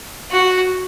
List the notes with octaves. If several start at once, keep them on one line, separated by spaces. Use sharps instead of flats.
F#4